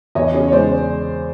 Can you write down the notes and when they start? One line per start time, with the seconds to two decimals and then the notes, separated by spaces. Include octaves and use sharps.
0.15 E2 C#5 D#5
0.34 C#3
0.48 C#5
0.52 G#3 C5 D5